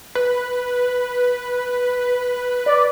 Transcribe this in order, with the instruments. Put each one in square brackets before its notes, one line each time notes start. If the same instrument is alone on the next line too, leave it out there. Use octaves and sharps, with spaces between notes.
[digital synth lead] B4
[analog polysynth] D5